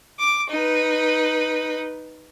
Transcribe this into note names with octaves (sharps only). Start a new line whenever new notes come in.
D6
D#4 B4